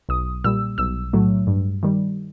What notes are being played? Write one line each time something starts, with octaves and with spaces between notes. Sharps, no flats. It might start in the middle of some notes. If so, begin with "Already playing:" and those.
B1 D#6
A#2 G3 E6
B1 E6
A2 F#3 A3
G2
D#3 G3